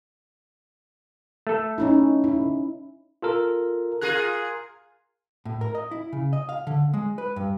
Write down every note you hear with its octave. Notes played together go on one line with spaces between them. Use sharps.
A3 A4
C#4 D#4 E4
E4
F4 A4 A#4
F4 G#4 A#4 F#6
A2
A#4
D#5
E4
C#3
D#5
F5
D3
G#3
B4
G2